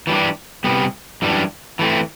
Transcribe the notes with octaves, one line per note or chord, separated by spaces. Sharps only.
E3 G3 D4
C3 G3 B3
F#2 E3 G3 D4
E3 A3 C4